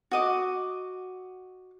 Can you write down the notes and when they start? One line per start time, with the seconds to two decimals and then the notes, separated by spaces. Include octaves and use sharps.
0.11 F#4 D#5 D6